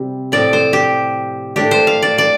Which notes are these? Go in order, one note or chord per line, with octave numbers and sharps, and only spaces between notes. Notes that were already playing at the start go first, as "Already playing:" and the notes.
Already playing: C3 G3 C4
A2 F3 C4 D5
C5
G4
A2 A3 D4 G4
C5
F5
D5
D5